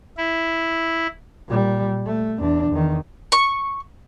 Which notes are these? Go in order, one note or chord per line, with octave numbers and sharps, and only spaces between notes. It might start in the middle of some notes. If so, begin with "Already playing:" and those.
E4
A#2 G3
A3
E2 D4
E2 D#3
C#6